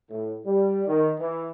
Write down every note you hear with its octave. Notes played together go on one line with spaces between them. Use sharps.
A2
G3
D#3
E3